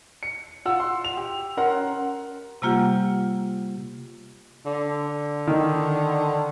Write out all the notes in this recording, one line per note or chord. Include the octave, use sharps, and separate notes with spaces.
C#7
F4 F#5 E6
C6
F7
G4
C#4 A#4 F#5 A#5 C6
C3 G3 A#3 F4 G4 F#5
D3
D#3